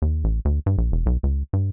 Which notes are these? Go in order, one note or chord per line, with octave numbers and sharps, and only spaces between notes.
D#2
A1
D2
G2
A#1
E1
B1
C#2
G2